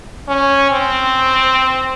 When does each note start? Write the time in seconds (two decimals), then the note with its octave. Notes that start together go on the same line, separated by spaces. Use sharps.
0.28 C#4
0.71 C4